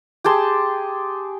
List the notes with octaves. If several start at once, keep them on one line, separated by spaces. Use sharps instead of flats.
G4 G#4 A5 C6